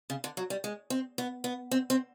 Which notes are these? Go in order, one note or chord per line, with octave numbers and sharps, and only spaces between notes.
C#3
D3
F#3
G3
G#3
C4
B3
B3
C4
C4